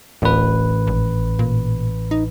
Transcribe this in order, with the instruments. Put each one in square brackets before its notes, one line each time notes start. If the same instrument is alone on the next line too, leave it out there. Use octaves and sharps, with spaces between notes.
[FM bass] D1 [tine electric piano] A1 B4
[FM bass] G#1
A#2
D#4